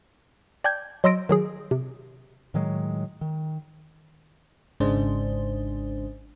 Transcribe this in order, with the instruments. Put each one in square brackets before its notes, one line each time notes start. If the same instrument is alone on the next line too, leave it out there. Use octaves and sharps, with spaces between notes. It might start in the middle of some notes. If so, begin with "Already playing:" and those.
[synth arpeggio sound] D5 G5 A5 G6 G#6
F#3 D#5 C6 E6 A#6 D7
D#3 F#3 G#4
C3
[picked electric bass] A2 D#3 F#3 G#3
D#3
[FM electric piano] G#1 G#2 C#3 G#3 D4 C5